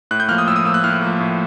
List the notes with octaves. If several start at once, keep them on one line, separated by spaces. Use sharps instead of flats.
A2 F#6
G6
F3 A#3 F6
D#6
A2 E6
D#6
F3 A#3 E6
F#6
A2 F6
F3 A#3
A2